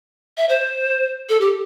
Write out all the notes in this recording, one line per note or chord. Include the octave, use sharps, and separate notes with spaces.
E5
C5
A4
G4